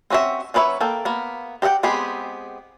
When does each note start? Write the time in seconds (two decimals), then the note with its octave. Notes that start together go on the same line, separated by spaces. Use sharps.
0.10 C4 C#4 F#4 D#5 E5
0.54 F#3 C#4 B4 C#5 E5
0.81 A#3 A4 G5
1.05 A#3 B3
1.62 G4 D#5 E5 F#5 G5
1.83 G#3 B3 C4 G4 G#4